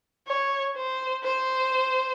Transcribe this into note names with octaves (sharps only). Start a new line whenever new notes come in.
C#5
C5
C5